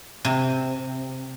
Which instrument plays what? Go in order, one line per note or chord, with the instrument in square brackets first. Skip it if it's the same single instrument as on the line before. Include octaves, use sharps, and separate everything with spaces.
[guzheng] C3